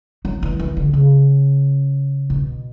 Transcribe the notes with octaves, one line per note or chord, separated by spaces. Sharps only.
F#3
E3
E3
D3
C#3
B2